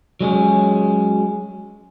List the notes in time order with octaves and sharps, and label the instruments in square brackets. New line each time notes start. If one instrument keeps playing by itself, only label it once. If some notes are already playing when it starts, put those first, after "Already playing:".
[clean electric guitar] F#3 G#3 C#4